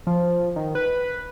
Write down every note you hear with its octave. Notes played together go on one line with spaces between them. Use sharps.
F3
D#3
B4